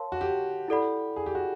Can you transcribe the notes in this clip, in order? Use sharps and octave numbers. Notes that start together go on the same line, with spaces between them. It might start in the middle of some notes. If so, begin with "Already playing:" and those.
Already playing: A#4 C#5 F5 A5 C6
F#4
G4
E4 A4 D5 F#5 B5
G#4
G4
F#4